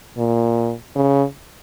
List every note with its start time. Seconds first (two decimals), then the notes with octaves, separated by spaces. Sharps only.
0.18 A#2
0.96 C#3